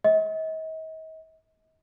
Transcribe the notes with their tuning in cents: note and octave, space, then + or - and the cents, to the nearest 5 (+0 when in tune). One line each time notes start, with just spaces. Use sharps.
D#5 +40